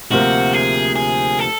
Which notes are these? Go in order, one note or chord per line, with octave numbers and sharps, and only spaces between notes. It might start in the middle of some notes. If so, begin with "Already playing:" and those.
D2 C3 F3 A#3 F#4
G#4
G#4
A4